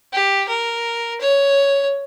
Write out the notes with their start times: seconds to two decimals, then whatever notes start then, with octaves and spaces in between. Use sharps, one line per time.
0.12 G4
0.48 A#4
1.21 C#5